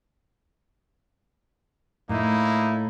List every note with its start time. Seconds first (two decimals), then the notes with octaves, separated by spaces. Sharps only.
2.09 A2 A#3 D#4 E4